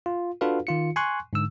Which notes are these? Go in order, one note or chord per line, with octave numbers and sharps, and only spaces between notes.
F4
D4 F4 F#4 A4 B4 F5
D#3 F4 C#7
G#5 C6 C#6 F#6
G#2 D3 E6